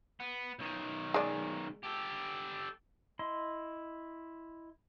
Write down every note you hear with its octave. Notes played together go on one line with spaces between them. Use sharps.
B3
B1 D#3
G#3 G#4 D5
G4 A4
E4 D#5 C6